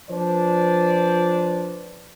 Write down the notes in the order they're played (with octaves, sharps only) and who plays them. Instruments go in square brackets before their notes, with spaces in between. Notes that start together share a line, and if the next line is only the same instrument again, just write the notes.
[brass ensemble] F3 D4 B4 C5 D5